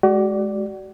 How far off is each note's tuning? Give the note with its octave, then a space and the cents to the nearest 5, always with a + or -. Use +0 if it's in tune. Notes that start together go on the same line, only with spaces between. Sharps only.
G#3 +20 F#4 +35 D5 +0